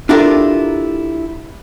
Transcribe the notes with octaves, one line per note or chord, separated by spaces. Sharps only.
D4 E4 F4 G4 A4 A#4